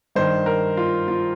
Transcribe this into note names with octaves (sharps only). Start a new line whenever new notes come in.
G2 D#3 C5
A#4
F4
F4